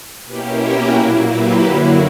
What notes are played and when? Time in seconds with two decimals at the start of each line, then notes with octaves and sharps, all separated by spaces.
0.24 B2 A#3 C#4 E4 G4 B4
0.58 F#4 A#4
0.92 A#2 F#3 A#3 E4
1.26 G4 B4
1.60 F#2 D3 F#3 A#3 E4